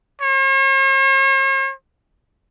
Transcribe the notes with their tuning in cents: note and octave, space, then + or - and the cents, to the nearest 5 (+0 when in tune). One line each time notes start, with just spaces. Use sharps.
C#5 -45